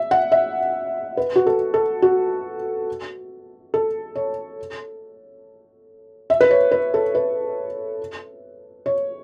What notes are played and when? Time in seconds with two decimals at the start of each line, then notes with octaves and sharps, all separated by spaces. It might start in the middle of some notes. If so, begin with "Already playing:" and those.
Already playing: E5
0.11 F#5
0.32 E5
1.17 B4
1.36 F#4
1.47 A4
1.74 A4
2.02 F#4
3.74 A4
4.15 C#5
6.30 E5
6.41 B4
6.51 C#5
6.71 B4
6.94 A4
7.15 B4
8.86 C#5